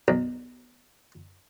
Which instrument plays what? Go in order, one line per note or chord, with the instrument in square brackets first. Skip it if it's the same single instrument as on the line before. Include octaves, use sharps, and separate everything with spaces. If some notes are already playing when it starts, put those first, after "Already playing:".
[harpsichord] B1